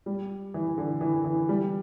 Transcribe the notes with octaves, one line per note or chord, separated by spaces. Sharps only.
G3
E3
D3
E3
E3
G3